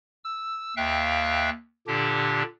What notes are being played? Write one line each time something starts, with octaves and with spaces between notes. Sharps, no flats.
E6
D#2 E5 F5 G5 F#6
A#2 D3 D4 G4